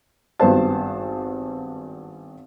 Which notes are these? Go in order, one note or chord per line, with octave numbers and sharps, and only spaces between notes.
G#1 G2 B3 C5 A5